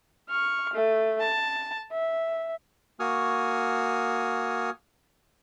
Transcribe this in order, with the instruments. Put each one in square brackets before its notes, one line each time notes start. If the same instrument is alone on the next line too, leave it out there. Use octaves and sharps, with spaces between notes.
[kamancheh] C#6 F6
A3
A5
E5
[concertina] A#3 F#4 G#5 C#6 D#6 F6